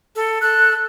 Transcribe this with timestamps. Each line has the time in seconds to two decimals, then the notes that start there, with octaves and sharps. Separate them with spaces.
0.15 A4
0.41 A4 F#6